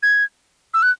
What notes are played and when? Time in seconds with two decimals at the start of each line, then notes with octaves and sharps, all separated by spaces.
0.03 G#6
0.74 E6
0.82 F#6